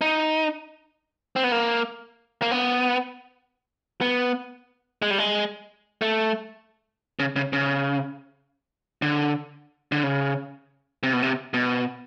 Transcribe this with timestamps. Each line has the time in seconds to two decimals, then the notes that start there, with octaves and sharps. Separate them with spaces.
0.01 D#4
1.36 C4
1.44 B3
1.52 A#3
2.42 A#3
2.51 B3
4.01 B3
5.02 G#3
5.11 G3
5.19 G#3
6.01 A3
7.19 C#3
7.36 C#3
7.53 C#3
9.02 D3
9.92 D3
10.03 C#3
11.03 C3
11.13 B2
11.22 C3
11.54 B2